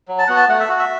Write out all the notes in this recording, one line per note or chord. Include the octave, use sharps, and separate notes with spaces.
F#3
A5
B3 F#4 F#5
A5
A3 F#5
E5
F#4
E5